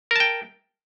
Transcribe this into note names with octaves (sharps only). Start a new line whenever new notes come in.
A#4 G5 A5